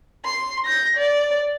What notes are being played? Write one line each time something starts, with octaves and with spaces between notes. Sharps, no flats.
C6
G6 A#6
D5